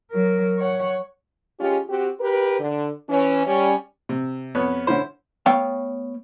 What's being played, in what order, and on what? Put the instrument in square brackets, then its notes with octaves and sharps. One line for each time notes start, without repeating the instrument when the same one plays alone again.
[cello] F#3 A#4
C#5 F#5
[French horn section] G#3 C#4 F4 G4
C4 F#4 G4
G4 A#4 B4
D3
E3 C#4
G3 C#4
[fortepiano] C3
F2 B3 C#5
D3 C#4 E4 C5
[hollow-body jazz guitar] A3 B3 C#5 F5 G5